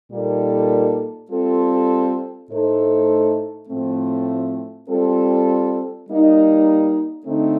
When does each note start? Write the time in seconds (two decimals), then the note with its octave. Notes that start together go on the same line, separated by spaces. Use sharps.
0.11 A#2 G3 A#3 D#4 A4
1.30 G3 C4 F4 A4
2.49 A2 A3 D#4 A4 C5
3.68 A2 F3 A3 C4
4.88 G3 C4 F4 A4
6.08 G3 A#3 D#4
7.26 D3 A3 C4 D#4